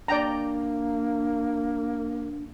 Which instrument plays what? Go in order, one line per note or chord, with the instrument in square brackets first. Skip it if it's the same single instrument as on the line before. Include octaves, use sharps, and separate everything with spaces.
[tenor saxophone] A#3 [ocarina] D4 [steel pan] D5 G5 A#5